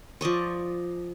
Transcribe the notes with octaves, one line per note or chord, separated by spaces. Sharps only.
F3 D5 D#5 C#6